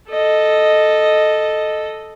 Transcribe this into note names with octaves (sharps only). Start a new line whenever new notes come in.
A4 D#5